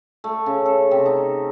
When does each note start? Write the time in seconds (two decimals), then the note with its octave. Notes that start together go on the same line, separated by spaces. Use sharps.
0.24 A3
0.46 C#3
0.65 A4
0.91 C3
1.06 D#4